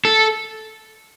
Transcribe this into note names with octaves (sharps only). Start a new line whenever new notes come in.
A4